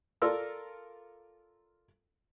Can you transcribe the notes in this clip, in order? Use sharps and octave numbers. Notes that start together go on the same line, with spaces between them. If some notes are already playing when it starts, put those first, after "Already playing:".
F4 A4 A#4 D5 C6 E6